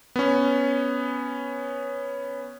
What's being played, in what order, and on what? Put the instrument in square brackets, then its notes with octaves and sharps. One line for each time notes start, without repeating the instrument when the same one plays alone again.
[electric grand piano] B3 C#4